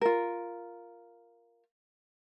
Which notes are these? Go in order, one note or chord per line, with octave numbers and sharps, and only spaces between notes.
F4 A#4